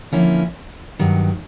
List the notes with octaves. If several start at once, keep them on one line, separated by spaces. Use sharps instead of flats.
D3 F3 A#3 C#4 E4
G2 D#3 F#3